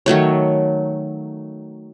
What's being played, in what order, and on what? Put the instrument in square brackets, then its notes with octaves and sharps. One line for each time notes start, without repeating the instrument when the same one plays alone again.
[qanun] D#3 F#3 A3 C#5